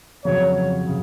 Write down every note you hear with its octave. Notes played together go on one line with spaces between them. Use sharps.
F2 C#3 F#3 C#5
C#3